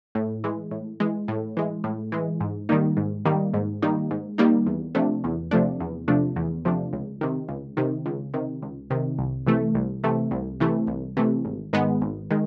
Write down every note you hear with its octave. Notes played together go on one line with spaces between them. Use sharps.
A2
E3 G#3
A2
E3 G#3
A2
E3 G#3
A2
E3 G#3
G#2
D#3 G3 A#3 D#4
G#2
D#3 G3 A#3 D#4
G#2
D#3 G3 A#3 D#4
G#2
D#3 G3 A#3 D#4
E2
C3 F3 A3 D4
E2
C3 F3 A3 D4
E2
C3 F3 A3 D4
E2
C3 F3 A3 D4
C#2
C3 D#3
C#2
C3 D#3
C#2
C3 D#3
C#2
C3 D#3
C2
C3 E3 A3
C2
C3 E3 A3
C2
C3 E3 A3
C2
C3 E3 A3
G#1
G#2 D#3 G#3 B3
G#1
D#3 G#3